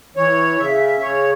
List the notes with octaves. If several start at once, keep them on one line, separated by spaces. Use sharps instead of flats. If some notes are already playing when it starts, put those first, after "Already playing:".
E3 C#5
C#3 E5
C#3 C#5